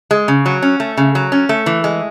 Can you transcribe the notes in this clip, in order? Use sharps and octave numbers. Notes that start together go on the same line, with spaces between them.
G#3
C#3
F#3
C#4
A3
C#3
F#3
C#4
A3
E3
G#3